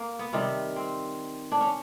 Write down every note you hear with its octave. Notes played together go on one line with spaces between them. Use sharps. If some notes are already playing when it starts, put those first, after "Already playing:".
Already playing: A#3
B3
C3 D#3 G3
C4
D4
C#4